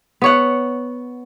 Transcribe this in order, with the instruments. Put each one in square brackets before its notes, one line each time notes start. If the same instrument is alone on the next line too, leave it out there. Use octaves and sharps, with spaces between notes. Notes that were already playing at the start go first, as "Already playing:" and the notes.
[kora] B3 C#5 F#5